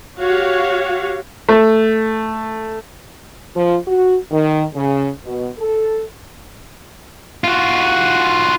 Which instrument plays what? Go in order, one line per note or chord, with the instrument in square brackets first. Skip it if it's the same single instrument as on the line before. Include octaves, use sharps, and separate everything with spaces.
[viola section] F#4 G4 C#5 F5
[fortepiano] A3
[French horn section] F3
F#4
D#3
C#3
B2
A4
[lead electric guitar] F4 F#4